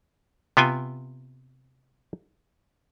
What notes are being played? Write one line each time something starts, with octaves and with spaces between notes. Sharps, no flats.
C3 B3 F4 G5 G#5